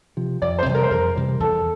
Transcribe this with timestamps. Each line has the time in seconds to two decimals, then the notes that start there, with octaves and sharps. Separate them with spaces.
0.17 C3 F3
0.42 F2 D5
0.59 C5
0.66 C3 E3 G3
0.75 A#4
0.83 C5
0.90 F2 A#4
1.15 C3 E3 G3
1.40 E2 A4